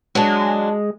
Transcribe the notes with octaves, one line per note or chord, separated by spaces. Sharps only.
F#3 G#3 D4